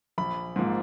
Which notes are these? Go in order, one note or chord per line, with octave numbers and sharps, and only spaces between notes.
A#1 B5
G#2 F3 A#3